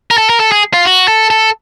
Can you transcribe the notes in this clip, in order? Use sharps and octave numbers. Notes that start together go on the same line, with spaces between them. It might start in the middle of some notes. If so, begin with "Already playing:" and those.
A#4
A4
A#4
A4
G#4
F4
F#4
A4
A4